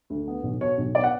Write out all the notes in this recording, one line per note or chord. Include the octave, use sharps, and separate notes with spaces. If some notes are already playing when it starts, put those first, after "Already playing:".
D2
B3
B1
B2 C#5
B1
B3 D5
F#5